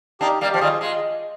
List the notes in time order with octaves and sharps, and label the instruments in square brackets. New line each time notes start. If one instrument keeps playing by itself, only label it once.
[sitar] A#3 D4 [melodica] D#4 G4
[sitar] G3 A#3
[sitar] F3 [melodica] G4
[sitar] D#3 G3 [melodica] F4 G#4
[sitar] G#3 [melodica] F4